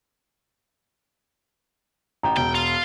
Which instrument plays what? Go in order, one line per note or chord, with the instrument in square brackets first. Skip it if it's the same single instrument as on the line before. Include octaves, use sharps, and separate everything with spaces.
[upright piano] A1 G5 [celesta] A#5
[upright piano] E1 [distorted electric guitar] G5
[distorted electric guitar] F4